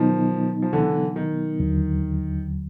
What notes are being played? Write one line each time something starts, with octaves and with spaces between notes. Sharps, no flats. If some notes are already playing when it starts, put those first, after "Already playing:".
Already playing: B2 D#3 F3 F#3 B3 D#4
F3
D3 E3
D#3
D#2 D3 F#3